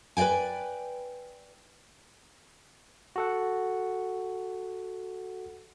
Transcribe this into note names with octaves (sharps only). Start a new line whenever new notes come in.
B4 D5 D#5 G5 G#5
F#4 A4 F#5